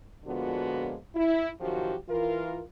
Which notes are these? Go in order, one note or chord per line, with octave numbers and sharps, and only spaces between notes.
A#2 D3 F3 G#3 B3 F#4
E4
C3 D#3 F3 F#3 F#4 G4
E3 F4 A#4